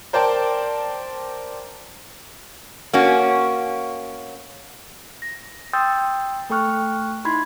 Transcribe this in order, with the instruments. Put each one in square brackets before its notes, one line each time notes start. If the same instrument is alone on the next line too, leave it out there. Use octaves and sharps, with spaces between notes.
[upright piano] A#4 C5 D5 G5 A5
[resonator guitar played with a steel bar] A#3 C#4 F#4
[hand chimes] A#6
G5 C6 D#6 E6 G6 A6
A3 A4 G5 C#6 F6 F#6
D#4 E4 B5 C6 G#6